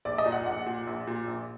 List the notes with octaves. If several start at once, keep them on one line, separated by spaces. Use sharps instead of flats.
A#1 D5
D#5
A#2
F#5
A#1 F#5
A#2
A#1
A#2
A#1